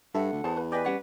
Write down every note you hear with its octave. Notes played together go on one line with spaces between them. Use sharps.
G2 A4 E5 F#5
D2
E2 G#4 C5 A5
B4
G4 B4 D5 D#5 G5 G#5
G3 C#4 C#5 D5 F#5